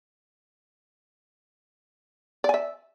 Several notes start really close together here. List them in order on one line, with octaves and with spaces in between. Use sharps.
D5 G#5 E5